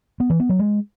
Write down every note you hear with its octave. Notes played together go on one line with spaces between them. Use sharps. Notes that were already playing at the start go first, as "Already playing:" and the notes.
B3
E3
B3
F#3
G#3